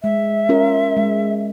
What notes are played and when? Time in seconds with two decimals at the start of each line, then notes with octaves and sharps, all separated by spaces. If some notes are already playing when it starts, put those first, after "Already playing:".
0.03 G#3 E5
0.49 C#4 F4 A#4
0.97 G#3